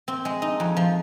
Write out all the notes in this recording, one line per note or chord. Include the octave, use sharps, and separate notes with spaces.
C4
G#3
D#4
F2
F3